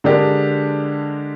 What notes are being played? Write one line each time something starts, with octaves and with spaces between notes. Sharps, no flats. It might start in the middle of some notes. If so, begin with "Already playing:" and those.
D3 G#3 D4 G4 A#4